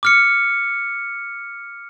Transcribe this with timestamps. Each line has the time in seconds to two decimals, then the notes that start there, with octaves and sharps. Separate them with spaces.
0.03 D6 F6 C#7